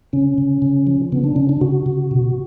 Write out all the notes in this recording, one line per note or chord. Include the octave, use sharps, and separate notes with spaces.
C#3 C#4
C#3
C#3
F3
C#3 B3
D4
C#3 C#4
D4
C#3 F#4
C#3
B2